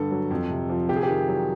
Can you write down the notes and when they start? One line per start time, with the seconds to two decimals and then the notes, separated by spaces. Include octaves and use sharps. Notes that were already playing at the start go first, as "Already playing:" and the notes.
Already playing: G2 D3 A4
0.11 F#3
0.31 F2
0.50 C3
0.69 F3
0.89 C3 G4
0.96 G#4
1.03 G4
1.09 D#3
1.28 F#3